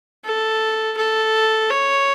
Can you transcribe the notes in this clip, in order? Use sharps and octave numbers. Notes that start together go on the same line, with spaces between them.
A4
A4
C#5